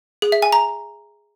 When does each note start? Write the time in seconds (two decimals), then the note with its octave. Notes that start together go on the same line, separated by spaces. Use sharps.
0.22 G#4
0.32 E5
0.42 G#5
0.52 A#5